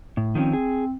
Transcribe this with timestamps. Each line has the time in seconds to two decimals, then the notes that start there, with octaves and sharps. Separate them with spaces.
0.17 A2
0.35 D#3 F3 C4 C#4
0.53 G#4